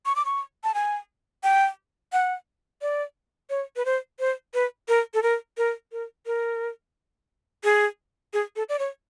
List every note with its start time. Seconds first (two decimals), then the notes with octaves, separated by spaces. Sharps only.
0.06 C#6
0.16 D6
0.25 C#6
0.64 A5
0.74 G#5
1.44 G5
2.13 F#5
2.82 D5
3.50 C#5
3.76 B4
3.85 C5
4.20 C5
4.54 B4
4.88 A#4
5.14 A4
5.23 A#4
5.58 A#4
5.92 A#4
6.26 A#4
7.64 G#4
8.33 G#4
8.56 A4
8.69 D5
8.79 C#5